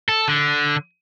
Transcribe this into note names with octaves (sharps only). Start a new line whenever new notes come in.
A4
D3